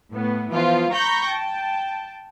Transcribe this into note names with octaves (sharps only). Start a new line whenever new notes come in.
A2 B3
E3 F3 B3 F4
A#5 B5 C#6 G6 A#6
G5 A5